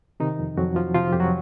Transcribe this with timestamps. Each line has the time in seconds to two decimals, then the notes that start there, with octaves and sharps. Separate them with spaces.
0.20 C3 D#3 D#4
0.39 F2
0.57 F2 F#3 F#4
0.76 F3 F4
0.95 C3 F3 F4
1.13 F2 G4
1.20 F#3 F#4